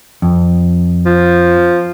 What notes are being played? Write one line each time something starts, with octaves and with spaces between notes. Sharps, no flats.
F2
F3